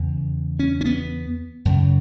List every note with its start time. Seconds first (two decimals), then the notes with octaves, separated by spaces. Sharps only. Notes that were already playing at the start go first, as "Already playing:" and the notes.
Already playing: E2 C#3
0.59 C#4
0.81 C#4
0.85 B3
1.65 F#2 C#3